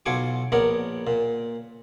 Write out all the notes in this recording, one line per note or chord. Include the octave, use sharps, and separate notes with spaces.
B1 F#3 F4 G#5 C#6 D6
A#1 B3 A#4 C#5 D5
A#2